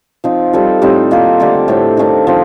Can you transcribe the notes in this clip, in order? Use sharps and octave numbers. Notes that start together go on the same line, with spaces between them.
F3 C4 D#4
G3 C4 F4 A4
A2 G3 C4 D#4
D#3 A#3 F4 A4
D3 A3 D4 G4
A2 A3 C4
D#3 A3 D4
D3 F3 C4 D#4